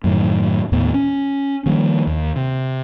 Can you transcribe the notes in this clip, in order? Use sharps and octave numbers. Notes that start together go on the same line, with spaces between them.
F#2 A2 D#3
D#2 A2 B3
C#4
D#3 F3 G3 A#3
D#2
C3